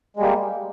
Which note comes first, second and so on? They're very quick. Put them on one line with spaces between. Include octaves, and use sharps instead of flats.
G#3 G3 A#3